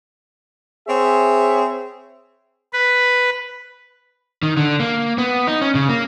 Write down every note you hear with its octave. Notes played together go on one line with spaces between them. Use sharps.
C4 G#4 C#5 E5
B4
D#3
D3
A#3
B3
D#4
C#4
C#3
A#3